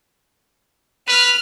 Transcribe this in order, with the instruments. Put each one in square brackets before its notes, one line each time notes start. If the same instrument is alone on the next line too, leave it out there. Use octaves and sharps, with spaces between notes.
[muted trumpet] B4 [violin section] F6